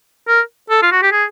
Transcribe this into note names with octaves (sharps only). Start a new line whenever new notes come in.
A#4
A4
F4
F#4
G4
G#4